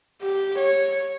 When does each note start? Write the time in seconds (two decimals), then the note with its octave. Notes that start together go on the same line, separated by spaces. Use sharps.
0.22 G4
0.59 C#5